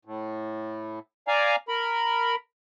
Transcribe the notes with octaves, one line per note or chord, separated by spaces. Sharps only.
A2
D5 F5 G#5 A#5
A#4 B5